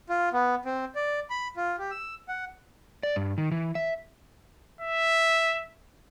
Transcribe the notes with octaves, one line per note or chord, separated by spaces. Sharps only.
F4
B3
C4
D5
B5
F4
G4
E6
F#5
D5
G2
D#3
E3
E5
E5